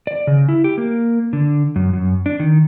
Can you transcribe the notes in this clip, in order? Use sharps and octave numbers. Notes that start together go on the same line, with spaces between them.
D5
C#3
E4
G4
A#3
D3
F#2
F#2
D4
D#3